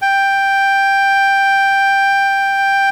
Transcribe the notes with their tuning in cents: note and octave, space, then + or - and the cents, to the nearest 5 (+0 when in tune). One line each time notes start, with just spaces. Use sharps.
G5 +5